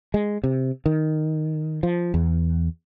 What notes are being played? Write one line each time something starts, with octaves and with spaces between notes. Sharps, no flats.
G#3
C3
D#3
F3
E2